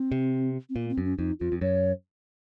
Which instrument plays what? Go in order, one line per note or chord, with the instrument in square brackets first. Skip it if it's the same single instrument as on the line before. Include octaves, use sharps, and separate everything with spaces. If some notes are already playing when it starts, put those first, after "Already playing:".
Already playing: [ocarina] C4
[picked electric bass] C3
[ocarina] C4
[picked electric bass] A#2 [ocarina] A#3
[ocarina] C4
[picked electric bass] F#2
[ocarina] C#4
[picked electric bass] F2 [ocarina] D#4
[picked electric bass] F2 [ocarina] F4
[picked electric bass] F2
[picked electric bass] F#2 [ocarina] C#5